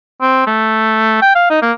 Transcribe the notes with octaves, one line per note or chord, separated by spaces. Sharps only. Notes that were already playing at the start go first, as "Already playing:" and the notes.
C4
A3
G5
F5
D#4
A#3